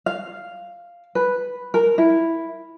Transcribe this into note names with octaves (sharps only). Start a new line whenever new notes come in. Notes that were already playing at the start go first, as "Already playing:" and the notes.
F5
B4
A#4
E4